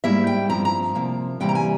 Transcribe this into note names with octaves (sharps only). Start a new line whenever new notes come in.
G#2 G3 A#3 E4 E5
G5
G2 F3 C4 A#5
A#5
C3 F3 A#3
C3 E3 G3 A#3 G5
A#5
G#5